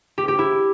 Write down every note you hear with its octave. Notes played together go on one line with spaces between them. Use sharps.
G4
G4
E4